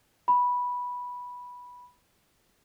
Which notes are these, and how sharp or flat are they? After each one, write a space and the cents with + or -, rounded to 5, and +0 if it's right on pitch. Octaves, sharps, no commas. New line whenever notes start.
B5 -10